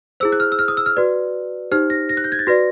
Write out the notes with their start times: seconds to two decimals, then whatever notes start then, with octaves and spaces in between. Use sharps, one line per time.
0.20 E4 G#4 C5 E6
0.32 F#6
0.40 F6
0.52 E6
0.59 F6
0.68 D#6
0.77 E6
0.86 F6
0.97 F#4 B4 D5
1.71 D#4 G4 C5 F6
1.90 A#6
2.09 A#6
2.17 F#6
2.24 G6
2.32 G#6
2.39 A6
2.47 F#4 B4 D5 A#6